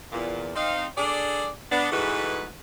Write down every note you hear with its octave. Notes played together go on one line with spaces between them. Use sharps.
E2 A#2
C4 D#4 F5
D4 G#4 A4 D5
B3 D4
G#2 E3 G#3 A3 F#4 B4